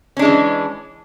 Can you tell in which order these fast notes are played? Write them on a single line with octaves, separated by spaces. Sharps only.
C#4 D4 G#3 E3